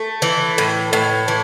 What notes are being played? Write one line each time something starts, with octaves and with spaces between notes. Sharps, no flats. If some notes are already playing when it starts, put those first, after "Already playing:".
Already playing: A3
E3
A2
A2
E3